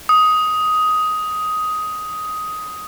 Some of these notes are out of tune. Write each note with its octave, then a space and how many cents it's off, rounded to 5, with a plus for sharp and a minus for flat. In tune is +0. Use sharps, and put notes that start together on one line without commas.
D#6 +10